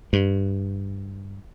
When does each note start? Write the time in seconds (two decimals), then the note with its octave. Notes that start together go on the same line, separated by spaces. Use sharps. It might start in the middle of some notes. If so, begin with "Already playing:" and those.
0.13 G2